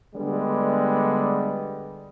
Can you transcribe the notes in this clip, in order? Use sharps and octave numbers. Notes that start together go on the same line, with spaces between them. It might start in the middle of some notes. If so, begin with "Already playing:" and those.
D3 G3 G#3 B3